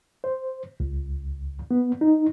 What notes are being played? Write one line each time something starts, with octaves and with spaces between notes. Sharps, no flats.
C5
C#2
B3
D#4